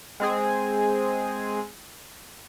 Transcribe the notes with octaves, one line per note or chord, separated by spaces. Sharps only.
G#3 C4 G#4